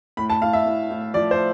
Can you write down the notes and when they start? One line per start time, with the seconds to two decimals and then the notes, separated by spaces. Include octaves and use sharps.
0.17 A2 B5
0.30 A5
0.42 A2 F5
0.53 E5
0.66 A2
0.90 A2
1.14 F3 D5
1.31 C5